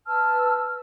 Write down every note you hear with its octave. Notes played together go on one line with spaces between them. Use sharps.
B4 A5 E6 F6